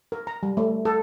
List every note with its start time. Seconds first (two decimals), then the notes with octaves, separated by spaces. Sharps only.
0.12 A#4
0.27 A#5
0.43 G3
0.57 A3
0.85 A4